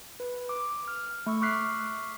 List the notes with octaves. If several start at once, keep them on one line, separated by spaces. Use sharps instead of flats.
B4
D6
F6
A3 C#6 E6
C#6 D6 F6 F#6 B6 C7